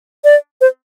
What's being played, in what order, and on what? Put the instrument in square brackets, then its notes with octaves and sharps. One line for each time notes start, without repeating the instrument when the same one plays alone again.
[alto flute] D5
C5